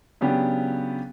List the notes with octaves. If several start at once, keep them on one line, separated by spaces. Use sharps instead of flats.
C#3 F#3 B3 D4 G4